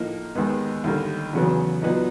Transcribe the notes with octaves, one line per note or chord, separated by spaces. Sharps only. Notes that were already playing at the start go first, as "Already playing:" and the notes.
Already playing: A2 F3 A#3 D#4
D#2 D#3 G#3 B3
D#2 D3 G3 A#3
E2 C#3 F#3 B3
A#2 F#3 B3 D#4